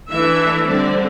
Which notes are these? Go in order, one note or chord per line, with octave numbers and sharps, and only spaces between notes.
E3 A3 D4 E5
D3 G3 C4 D5